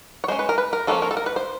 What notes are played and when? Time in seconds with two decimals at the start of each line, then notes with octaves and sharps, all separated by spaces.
0.24 C#5
0.28 G#3 C#4 C5
0.39 B4
0.49 A#4
0.58 B4
0.73 A#4
0.87 F3 A#3 C#4 A4
1.02 A#4
1.11 A4
1.17 A#4
1.26 B4
1.36 C5